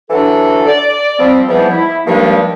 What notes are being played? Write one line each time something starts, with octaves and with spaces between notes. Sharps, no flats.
E3 F#3 D4 A4
D5
F3 G3 C4
G#2 E3 F3 G3 B3
E4
G2 D#3 F3 G3 G#3 A#3